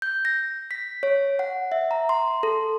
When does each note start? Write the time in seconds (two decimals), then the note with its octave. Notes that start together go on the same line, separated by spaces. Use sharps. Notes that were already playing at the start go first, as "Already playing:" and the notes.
0.02 G6
0.25 A#6
0.71 B6
1.03 C#5
1.39 F#5
1.72 E5
1.91 A#5
2.09 C6
2.43 A4